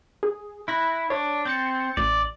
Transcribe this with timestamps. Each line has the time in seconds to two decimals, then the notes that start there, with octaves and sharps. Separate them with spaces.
0.23 G#4
0.68 E4 B5 F#6 A#6
1.10 D4 C#5
1.45 C4 G6 A6 C#7
1.97 A1 D5